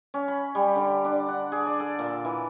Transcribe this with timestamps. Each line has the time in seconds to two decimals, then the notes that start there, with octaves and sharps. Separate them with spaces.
0.14 C#4
0.28 B5
0.55 G3
0.76 D3
1.05 D4
1.28 F#5
1.52 G#4
1.67 D5
1.80 A4
1.99 A#2
2.25 E3